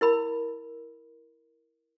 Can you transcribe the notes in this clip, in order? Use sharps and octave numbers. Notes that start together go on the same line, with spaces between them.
E4 A#4 B5